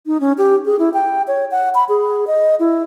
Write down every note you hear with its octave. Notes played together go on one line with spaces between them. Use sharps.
D#4
C#4
G4
G#4
E4
G5
C#5
F#5
B5
G#4
D#5
E4